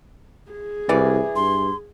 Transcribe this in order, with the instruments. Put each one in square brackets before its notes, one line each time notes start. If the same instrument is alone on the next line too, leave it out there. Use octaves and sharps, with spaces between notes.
[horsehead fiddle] G#4
[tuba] C2 [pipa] E3 D5
[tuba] G2 [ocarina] C6